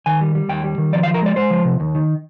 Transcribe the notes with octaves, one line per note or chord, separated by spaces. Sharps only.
D#3 G#5
G3
G3
D#2 G5
G3
D#3
F3 D5
F5
F3
A#4
G#3 D5
G#3 C5
F3
C3
D#2
D#3